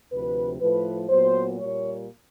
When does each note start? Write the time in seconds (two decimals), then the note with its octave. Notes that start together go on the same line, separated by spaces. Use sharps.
0.12 D2 C3 F3 B4
0.61 A2 F3 A3 B4
1.10 A#2 F#3 B3 C5
1.58 A#2 G3 A#3 C#5